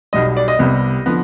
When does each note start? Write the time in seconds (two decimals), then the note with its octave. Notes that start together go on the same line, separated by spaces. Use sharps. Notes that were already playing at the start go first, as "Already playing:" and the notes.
0.13 B1 B2 G3 D#5
0.37 D5
0.48 D#5
0.59 C2 C3 G3 B3
1.06 D3 F3 B3